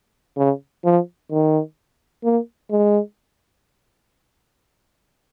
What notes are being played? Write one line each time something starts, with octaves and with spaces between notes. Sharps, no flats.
C#3
F3
D#3
A#3
G#3